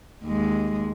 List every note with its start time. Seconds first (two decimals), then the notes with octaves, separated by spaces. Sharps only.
0.25 D#2 G#3